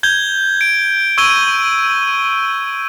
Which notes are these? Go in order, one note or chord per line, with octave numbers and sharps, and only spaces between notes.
G6 G#6 G7
D7
C#6 E6 G#6 D7 D#7 G7